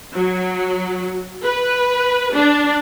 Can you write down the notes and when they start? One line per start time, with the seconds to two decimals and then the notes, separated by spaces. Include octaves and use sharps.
0.13 F#3
1.43 B4
2.34 D4